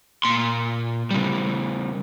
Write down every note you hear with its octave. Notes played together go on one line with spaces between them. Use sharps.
A#2 C6
C#3 G3